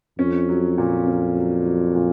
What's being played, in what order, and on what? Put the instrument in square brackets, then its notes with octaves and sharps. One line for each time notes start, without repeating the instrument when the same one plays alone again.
[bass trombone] F2 [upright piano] C#4
[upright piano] F#3
A#2
C#4
F#3
F#3
A#2